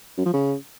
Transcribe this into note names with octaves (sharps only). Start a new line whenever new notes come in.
F#2
F3
C#3